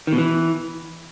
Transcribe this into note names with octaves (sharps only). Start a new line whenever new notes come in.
D#3
B2
E3